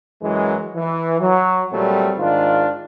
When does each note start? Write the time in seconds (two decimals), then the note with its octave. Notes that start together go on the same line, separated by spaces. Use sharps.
0.22 F#2 E3 F#3 G#3
0.76 E3
1.20 F#3
1.72 A#2 F#3 G3 A3 C4
2.18 G#2 D#3 D4 F4